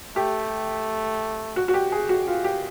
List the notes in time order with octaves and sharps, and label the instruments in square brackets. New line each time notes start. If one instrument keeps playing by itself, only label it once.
[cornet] A3 [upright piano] G4
[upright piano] F#4
F#4
G4
G#4
F#4
F4
G4